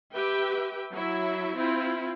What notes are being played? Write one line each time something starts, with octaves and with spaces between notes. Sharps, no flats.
G4 B4 E5 G5
F#3 E4 E5
C4 E4 F4